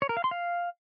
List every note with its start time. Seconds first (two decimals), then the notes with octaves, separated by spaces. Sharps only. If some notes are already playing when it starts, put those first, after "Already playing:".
0.02 C#5
0.09 A#4
0.17 F5
0.24 C6
0.31 F5